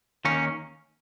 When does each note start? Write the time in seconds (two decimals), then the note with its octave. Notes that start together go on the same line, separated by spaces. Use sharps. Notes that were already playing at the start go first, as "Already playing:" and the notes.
0.25 D#2 D#3 A#3 C#4